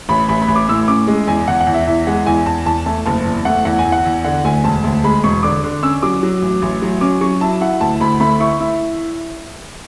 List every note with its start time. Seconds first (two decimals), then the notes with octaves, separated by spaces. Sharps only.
0.09 A1 B5
0.29 A1 B5
0.42 B5
0.48 A1
0.55 D6
0.69 A2 E6
0.88 C#4 D6
1.07 G#3
1.27 E2 G#5
1.48 E2 F#5
1.61 F#5
1.67 E2
1.74 E5
1.87 E2 E5
2.07 G#3 F#5
2.26 E2 G#5
2.46 E2 A5
2.66 E2 A5
2.86 A3 A5
3.05 F#1 A5
3.25 E2
3.45 A3 F#5
3.65 E2 F#5
3.78 G#5
3.85 E2
3.92 F#5
4.05 E2
4.24 D3 F#5
4.44 D2 G#5
4.64 E1 A5
4.84 D2
5.04 G#3 B5
5.24 E1 C#6
5.43 D3 D6
5.64 D3
5.83 C#4 E6
6.03 F#3 D6
6.23 F#3
6.42 A1
6.62 A1
6.82 F#3
7.01 C#4 D6
7.21 F#3 C#6
7.41 E4 A5
7.60 E4 F#5
7.81 D2 A5
8.00 D2 B5
8.20 A3 B5
8.40 E4 C#6
8.60 E4